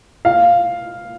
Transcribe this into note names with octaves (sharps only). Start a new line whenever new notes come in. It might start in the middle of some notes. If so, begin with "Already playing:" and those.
F5